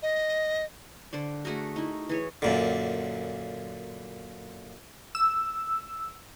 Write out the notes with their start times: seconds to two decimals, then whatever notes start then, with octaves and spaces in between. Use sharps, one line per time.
0.03 D#5
1.13 D3 C5 D5
1.45 A3 F#4 G#4 A#4
1.76 D#4 E4
2.09 E3 G#4 C#5
2.42 F#2 A#2 D3
5.15 E6